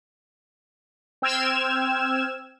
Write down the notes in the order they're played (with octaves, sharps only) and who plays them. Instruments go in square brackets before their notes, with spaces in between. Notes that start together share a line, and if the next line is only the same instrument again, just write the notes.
[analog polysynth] C4 G5 E6 F6 G#6 E7